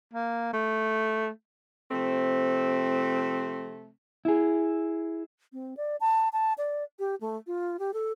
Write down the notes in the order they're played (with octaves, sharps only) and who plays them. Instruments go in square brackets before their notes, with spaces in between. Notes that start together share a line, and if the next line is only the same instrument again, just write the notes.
[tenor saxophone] A#3
A3
[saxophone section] C3 F3 A3 C4
[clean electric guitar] E4 G#4
[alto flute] C4
D5
A5
A5
D5
G4
A3
F4
G4
A4